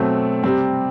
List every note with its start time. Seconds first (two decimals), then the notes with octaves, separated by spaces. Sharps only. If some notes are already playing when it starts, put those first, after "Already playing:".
Already playing: B2 F#3 A3 C4
0.43 C3 G3 C4